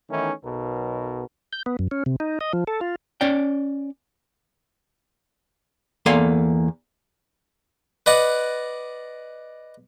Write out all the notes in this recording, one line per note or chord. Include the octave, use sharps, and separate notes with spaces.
D#3 E3 A3 B3 C#4 D#4
B1 B2 A#4
G6
B3
F#2
C#4
C3
D#4
D#5
F3
A4
F4
C#4 C#5 D5 G5
E2 A#3 A4 F5 G#5 C6
B4 D5 D#5 F#5